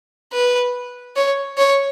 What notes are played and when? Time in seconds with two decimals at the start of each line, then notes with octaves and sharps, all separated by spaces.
0.33 B4
1.16 C#5
1.58 C#5